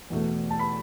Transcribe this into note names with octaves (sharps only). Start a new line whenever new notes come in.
E2 B2 A3
A5
B5